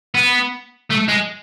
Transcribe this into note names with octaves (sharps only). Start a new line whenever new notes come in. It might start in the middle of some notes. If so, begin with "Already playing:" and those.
B3
A3
G#3